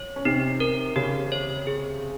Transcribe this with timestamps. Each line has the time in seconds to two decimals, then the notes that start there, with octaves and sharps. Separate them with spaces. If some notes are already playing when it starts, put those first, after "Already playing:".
Already playing: C#5
0.16 C#4
0.25 C3 C4 D#4
0.60 A#4
0.96 C#3 C#4 G4
1.32 C#5
1.67 G#4